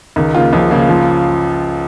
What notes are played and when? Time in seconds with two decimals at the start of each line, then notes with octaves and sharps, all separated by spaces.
0.16 C#2 D#3
0.35 C#3 A#3 F4
0.53 C#2 F3
0.71 C#3 A#3 F4
0.89 F3